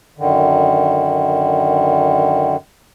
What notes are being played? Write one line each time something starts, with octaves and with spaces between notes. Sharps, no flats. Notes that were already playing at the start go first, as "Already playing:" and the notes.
F#2 D3 D#3